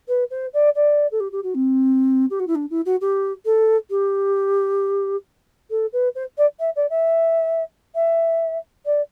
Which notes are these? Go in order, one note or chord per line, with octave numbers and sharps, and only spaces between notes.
B4
C5
D5
D5
A4
G4
G4
F#4
C4
G4
F#4
E4
D4
E4
F#4
G4
A4
G4
A4
B4
C5
D5
E5
D5
E5
E5
D5